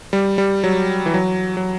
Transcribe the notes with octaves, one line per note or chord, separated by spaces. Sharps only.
G3
G3
F#3
E3
F#3
F#3